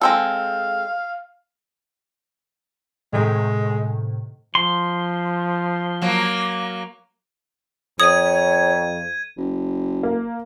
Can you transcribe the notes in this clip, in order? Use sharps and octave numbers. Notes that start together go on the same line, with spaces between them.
G#3 C4 A4 F5
A2 C3 D#3 G#3
F3 C6
F#3 A#3
F2 C#5 D#6 G#6 D#7
F#1
A#3